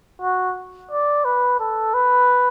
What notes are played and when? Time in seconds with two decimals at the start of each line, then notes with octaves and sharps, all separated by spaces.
0.22 F#4
0.91 D5
1.25 B4
1.60 A4
1.94 B4